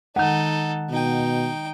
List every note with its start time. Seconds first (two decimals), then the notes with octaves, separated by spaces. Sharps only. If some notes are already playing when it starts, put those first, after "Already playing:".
0.16 D#3 G#3 D#4 A4 F#5
0.90 B2 D#4 G5